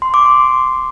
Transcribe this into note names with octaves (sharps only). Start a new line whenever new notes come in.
C6
D6
C6